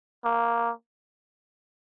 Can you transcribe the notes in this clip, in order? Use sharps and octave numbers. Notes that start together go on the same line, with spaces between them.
A#3